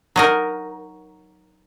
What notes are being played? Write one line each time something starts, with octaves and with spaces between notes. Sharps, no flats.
F#3 D#4 A#4